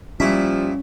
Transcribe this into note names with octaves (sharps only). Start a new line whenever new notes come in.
A#2 F3 G3 C#4 E4 E5